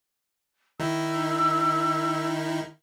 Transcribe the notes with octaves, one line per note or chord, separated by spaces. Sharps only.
D#3 D#4 E4 E6